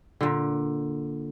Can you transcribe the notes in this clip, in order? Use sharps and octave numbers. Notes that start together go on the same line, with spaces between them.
A#2 D3